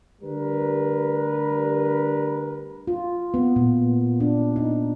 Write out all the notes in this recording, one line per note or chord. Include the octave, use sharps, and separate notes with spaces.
D3 G3 A3 A#4 B4
F4
B3
A#2
D4
D#4